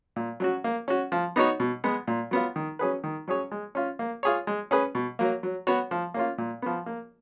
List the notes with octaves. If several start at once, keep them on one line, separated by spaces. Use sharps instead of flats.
A#2
F#3 C#4 F#4
A#3
C#4 F#4
F3
B3 D#4 F#4 C#5
B2
G#3 B3
A#2
F#3 B3 F4
D#3
F#3 C#4 G#4 B4
D#3
F#3 C#4 G#4 C#5
G#3
C#4 F4
A#3
F4 G#4 C#5
G#3
C#4 G#4 B4
B2
F#3 A#3
F#3
B3 F#4 C#5
F3
A#3 C#4 F4
A#2
F3 B3
A#3